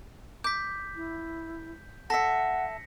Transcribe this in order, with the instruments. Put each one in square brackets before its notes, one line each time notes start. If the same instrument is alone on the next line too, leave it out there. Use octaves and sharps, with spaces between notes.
[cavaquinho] D6 [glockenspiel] G6 B6
[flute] E4
[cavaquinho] A4 E5 [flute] F#5 [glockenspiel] A#6 B6 C#7